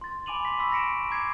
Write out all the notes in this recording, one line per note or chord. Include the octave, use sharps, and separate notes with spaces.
C6 A6
G#5 B5 D6 D#7 F7 F#7
C6 D6 B6
B5 C#6 E6 B6
A#6 B6 C#7 D7 E7
A#5 D6 G#6 C7